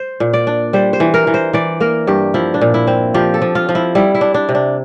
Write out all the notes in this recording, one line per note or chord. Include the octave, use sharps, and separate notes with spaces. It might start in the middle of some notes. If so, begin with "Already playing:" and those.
Already playing: C5
A#2
D5
D4
G3 C5
C5
E3
A#4
E3
C5
E3 D5
A#3 A#4
G2 G4
F3 E4
D4
A#2
E4
C4
F3 G4
A4
F3
F4
F3
E4
G3 E4
E4
D4
D4
C3
D4